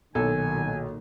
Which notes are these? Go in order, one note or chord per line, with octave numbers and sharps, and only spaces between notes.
B1 A#2 D#3 F#3 A4 G#5